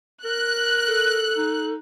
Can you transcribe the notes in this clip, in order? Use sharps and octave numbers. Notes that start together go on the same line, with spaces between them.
A#4 F#6
A4
D#4